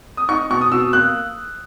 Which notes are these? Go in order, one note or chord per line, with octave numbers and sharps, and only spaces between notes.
D#6
D#4 C#6
B2 C#6
D#6
B2 E6
A#3 F#6